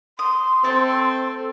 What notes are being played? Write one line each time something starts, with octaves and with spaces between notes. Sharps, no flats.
C6 D#6
A3 C4 A4